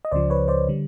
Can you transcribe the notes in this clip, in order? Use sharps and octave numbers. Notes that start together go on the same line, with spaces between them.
D#5
C#2 C#3 F3 C5 D5
B4 C#5
C5 D5
D3 G3